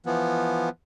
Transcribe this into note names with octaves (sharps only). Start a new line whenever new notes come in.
E3 F3 B3